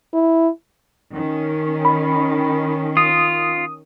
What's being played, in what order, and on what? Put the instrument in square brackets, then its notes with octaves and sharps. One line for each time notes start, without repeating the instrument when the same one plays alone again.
[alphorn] E4
[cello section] D#3 C#4
[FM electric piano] B5
[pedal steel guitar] F4 [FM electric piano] D#6